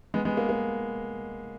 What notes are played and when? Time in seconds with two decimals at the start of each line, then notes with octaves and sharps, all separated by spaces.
0.14 G#3 B3
0.25 G#3 B3
0.37 A#3
0.49 A#3